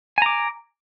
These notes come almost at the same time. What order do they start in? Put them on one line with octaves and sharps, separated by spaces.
G#5 A#5 D6